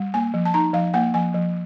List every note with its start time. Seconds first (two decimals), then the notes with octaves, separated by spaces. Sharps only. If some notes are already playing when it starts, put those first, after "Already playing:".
Already playing: G3
0.14 A#3 G#5
0.34 F3
0.45 A5
0.54 D#4 A#5
0.73 F3 F5
0.94 A#3 F#5
1.14 F3 G#5
1.34 F3